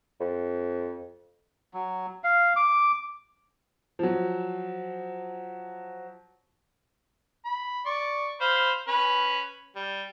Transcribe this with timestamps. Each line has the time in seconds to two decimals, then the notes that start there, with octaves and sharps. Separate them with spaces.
0.20 F2
1.74 F#3
2.24 F5
2.56 D6
3.99 F3 F#3
7.45 B5
7.86 D5 C#6
8.41 C5 F5 B5
8.88 C#4 B4
9.76 G3